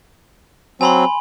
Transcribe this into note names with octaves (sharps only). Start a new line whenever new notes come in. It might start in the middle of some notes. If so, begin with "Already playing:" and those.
F#3 C4 G#5 B5 C6